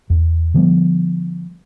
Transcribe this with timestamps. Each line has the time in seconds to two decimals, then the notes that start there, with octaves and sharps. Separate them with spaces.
0.10 E2
0.54 D3 F3 G3 B3